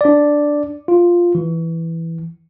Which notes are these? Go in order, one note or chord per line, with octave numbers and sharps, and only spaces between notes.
D4 D5
F4
E3